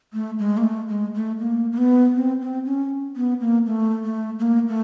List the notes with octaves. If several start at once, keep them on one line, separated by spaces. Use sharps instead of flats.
A3
G#3
A#3
A3
G#3
A3
A#3
A#3
B3
C4
C4
C#4
B3
A#3
A3
A3
A3
A#3
A3